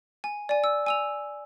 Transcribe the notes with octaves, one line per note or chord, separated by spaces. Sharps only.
G#5
D5 G#5
E6
G#5 E6 F7